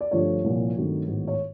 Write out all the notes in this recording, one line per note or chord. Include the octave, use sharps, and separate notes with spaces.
D5
G2 D3 F3 A3 C#5
C2 A#2 F3
G2 D#3 F#3 A3 C4
A1 G#2 D#3 F#3 B3
C#5